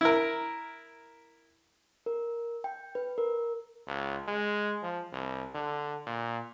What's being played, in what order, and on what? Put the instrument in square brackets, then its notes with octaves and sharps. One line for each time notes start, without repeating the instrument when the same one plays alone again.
[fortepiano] E4 A#4
[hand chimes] A#4
G5
B4
A#4
[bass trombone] C#2
G#3
F3
C2
D3
A#2